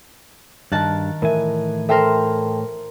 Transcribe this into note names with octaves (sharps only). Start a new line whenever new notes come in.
G2 D#3 A5 F#6
A2 E3 A#4 E5 G#5
A4 A#4 C5 E5 G5 A5